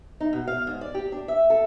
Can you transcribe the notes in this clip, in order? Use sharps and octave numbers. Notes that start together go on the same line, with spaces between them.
D#4
B2
F5
G#2
D5
G4
D4
E5
A4